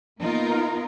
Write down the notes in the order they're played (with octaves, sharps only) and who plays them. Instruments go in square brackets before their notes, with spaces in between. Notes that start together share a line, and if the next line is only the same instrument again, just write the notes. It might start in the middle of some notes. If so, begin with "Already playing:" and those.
[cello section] A#3 B3 D#4 F4 A#4